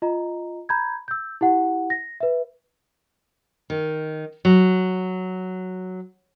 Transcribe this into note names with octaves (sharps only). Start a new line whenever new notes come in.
F4 D#5 A#5
A#5 B5 G6 G#6
E6 G6
E4 G4 F#5
A#6
B4 E5
D#3
F#3